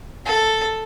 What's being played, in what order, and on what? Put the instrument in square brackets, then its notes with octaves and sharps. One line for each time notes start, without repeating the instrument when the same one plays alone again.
[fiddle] A4